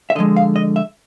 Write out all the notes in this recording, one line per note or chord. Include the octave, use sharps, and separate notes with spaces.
E5
D3 F3 G#3 D#5
F5
D#5
E5